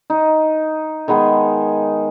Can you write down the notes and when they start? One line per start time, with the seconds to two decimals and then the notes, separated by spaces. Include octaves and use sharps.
0.10 D#4
1.08 D#3 G#3 B3 G#4